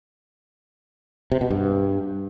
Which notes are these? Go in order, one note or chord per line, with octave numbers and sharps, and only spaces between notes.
C3
B2
G2